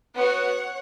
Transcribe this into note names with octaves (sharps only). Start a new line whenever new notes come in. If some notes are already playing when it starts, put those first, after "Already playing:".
B3 F#4 C#5 F#5